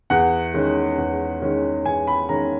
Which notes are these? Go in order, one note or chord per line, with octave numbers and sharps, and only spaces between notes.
E2 F#5
D#3 G#3 C#4
E2
D#3 G#3 C#4
E2 G#5
B5
D#3 G#3 C#4 A#5